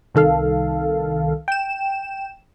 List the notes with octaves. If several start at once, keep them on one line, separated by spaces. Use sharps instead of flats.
C2 D#3 A4 F5
G5 E7